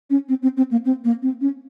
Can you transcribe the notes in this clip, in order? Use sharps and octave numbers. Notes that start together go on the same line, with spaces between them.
C#4
C4
C4
C4
A#3
C4
A#3
C4
C#4